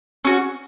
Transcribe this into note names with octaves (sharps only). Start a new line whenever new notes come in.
C#4 F#4